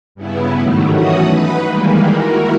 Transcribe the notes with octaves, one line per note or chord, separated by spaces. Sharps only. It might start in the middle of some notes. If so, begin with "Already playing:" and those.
G2 C#3 B3 E4
G#2 D#3 F#3 G3 A3
E3 A3 C#4 F#4 F#5 D#6
D#4 B4 B5
D#3 E3 G3 G#3 A#3
E4 F#4 A#4